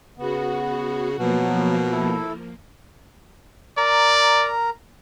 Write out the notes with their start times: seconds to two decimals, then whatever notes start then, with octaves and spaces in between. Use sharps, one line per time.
0.18 C#3 B3 F#4
1.19 B2 F3 F#3 A#3 B3
1.91 E4 A4
3.77 A#4 D5 A#5